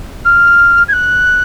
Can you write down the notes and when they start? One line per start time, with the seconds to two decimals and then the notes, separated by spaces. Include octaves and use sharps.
0.25 F6
0.88 G#6
0.93 F#6